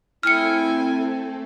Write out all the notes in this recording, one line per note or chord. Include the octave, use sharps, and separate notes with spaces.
A3 C4 E4 A4 G5 G#5 F6 C#7